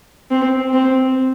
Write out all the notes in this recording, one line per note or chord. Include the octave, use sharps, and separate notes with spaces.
C4
C4